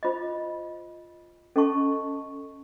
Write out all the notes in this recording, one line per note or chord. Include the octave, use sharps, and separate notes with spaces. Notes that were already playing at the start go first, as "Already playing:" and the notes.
F4 C5 D#5
C#4 A4 D#5 A5 C#6